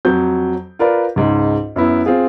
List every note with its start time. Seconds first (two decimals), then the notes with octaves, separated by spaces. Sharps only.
0.05 F2 F#3 G6
0.79 F4 A#4 B4 D5
1.16 C#2 G#2
1.76 F#2 B3 E4
2.06 C4 F4 G#4